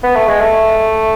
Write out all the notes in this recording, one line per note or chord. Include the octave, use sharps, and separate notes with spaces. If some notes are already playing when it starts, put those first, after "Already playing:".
B3
A3
G#3
A3